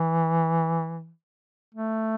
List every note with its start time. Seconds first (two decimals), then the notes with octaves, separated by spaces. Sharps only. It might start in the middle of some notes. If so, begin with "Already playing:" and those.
Already playing: E3
1.75 A3